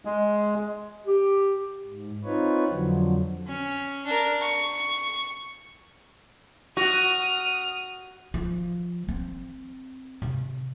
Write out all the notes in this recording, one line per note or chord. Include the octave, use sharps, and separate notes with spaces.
G#3
G4
G#2
C4 D#4 F4 B4 C#5
F2 D3 F3 F#3
C#4
D4 A#4
C#6
F#4 D#6 F6
F3
C4
C3